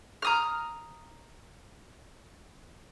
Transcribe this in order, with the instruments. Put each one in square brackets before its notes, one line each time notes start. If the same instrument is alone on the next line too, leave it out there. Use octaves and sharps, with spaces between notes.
[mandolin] A#5 D#6 F6